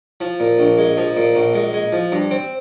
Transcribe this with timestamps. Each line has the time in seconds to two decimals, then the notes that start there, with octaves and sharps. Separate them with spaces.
0.21 F3
0.40 A#2
0.59 A#1
0.78 G#3
0.97 F3
1.17 A#2
1.35 A#1
1.55 G#3
1.73 G#3
1.92 F3
2.12 G2
2.31 C4